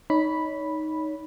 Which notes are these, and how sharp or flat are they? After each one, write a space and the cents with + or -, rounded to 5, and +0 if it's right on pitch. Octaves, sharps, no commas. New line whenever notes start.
D#4 +0 C#5 +30 B5 -5